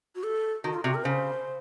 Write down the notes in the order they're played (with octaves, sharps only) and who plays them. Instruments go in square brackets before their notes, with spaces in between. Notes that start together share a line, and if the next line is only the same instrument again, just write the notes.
[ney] F#4
A4
[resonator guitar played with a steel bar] D#3 [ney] F#4
[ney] F4
[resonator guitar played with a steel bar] C3 [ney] F#4
[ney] A#4
[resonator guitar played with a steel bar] C#3 [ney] C5